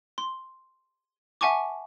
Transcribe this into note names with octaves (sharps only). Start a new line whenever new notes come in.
C6
E5 F#5 G#5 A5 C#6 D6